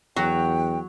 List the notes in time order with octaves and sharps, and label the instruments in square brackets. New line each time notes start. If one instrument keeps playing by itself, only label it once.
[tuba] E2 [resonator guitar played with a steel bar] F#3 [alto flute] G5